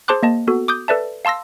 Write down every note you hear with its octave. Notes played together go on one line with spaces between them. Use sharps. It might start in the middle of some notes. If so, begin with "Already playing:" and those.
G#4 C5 A5 C6 D6 F#6
A#3 D#5 A5
B3 F#4 A4
D6 D#6 G6
A4 B4 D5 E5 A5
F5 A5 C6 E6 A#6